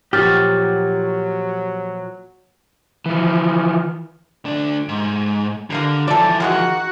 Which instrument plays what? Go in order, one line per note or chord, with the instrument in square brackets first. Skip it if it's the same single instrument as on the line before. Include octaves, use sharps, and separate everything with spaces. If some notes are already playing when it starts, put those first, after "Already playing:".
[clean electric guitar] A#2 F3 F#4 [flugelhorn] F#3 [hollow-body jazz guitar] G4 [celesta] F6 A6
[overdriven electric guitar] E3 F3
[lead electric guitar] D2 D4
G#2
[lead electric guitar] D3 [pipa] G3 A#3 A#4
[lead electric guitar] E3 F3 [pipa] A4 D5
[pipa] D#3 G#3 A#3 [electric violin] F#4 F#5